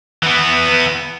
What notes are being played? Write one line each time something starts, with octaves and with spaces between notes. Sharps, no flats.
E3 B3